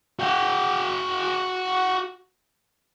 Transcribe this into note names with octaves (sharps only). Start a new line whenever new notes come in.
F#4 G5